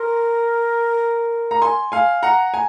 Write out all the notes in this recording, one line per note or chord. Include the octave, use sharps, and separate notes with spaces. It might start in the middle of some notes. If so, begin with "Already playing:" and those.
Already playing: A#4 C6
A#5
G#5 C6
F5 G#5
F#5 A#5
G#5